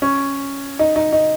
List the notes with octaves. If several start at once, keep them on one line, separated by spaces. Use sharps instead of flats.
C#4
D#4
D#4
D#4